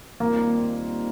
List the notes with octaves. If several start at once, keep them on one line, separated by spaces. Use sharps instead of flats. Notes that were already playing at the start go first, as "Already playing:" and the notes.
D#2 D#3 G3 A#3 C4 F4